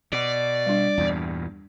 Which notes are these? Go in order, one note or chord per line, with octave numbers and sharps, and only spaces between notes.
B2 D5
G3 D4
E2 G2 A#2